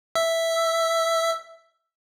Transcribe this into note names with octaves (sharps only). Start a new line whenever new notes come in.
E5 E6